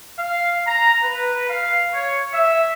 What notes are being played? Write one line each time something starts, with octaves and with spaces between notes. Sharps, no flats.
F5
A#5
B4
F5
C#5
E5